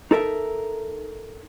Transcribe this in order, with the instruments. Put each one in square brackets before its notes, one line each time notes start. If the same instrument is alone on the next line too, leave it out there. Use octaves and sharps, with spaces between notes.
[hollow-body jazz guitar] D#4 A4 A#4 E5